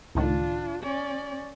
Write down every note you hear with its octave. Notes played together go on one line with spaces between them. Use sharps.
C#2 A2 D#3 D4 F4
C#4 D5